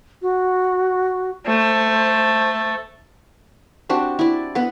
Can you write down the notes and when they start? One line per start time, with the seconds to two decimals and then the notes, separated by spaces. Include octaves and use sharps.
0.22 F#4
1.46 A3 C5
3.89 C4 D4 F#4 G4
4.19 E4 D5
4.55 B3 B4 F#5